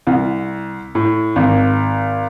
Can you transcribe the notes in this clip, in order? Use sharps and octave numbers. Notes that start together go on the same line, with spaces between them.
C2
A2
G#1